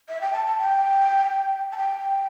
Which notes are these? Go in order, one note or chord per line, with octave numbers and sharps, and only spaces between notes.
E5
G5
A5
A5
G5
A5
G5